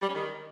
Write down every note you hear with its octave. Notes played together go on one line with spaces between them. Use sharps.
G3
C#4
D#3